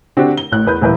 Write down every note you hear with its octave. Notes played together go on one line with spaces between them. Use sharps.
D3 C4 D4 F#4 G4
G7
A1 F#6
E2 B4 G6
D#1 E3 B4